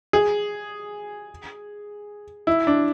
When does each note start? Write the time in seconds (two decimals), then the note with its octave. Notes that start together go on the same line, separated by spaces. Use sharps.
0.13 G#4
2.47 E4
2.67 D4